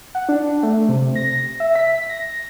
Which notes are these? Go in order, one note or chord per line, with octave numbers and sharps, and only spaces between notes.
F#5
D4
A3
C3
A#6
E5
B6
A#6